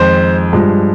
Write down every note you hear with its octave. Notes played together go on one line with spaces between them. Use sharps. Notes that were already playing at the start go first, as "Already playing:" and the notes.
Already playing: F2 D#3 G#3 C5
G2 F3 G#3